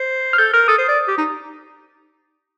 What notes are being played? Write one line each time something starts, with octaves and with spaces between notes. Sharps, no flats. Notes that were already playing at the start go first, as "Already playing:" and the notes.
Already playing: C5
F6
A4 G6
A#4 F6
A4 D#6
C5
D5
G4
D#4